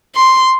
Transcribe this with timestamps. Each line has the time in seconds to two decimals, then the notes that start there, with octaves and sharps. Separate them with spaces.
0.15 C6